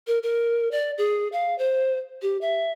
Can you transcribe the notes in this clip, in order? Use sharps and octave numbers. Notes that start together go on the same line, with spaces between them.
A#4
A#4
D5
G#4
F5
C5
G4
E5